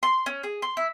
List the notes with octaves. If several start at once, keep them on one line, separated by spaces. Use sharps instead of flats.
C6
C#4
G#4
C6
E4